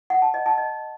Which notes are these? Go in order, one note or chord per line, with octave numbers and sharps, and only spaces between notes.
F#5
A5
D#5
A5
D#5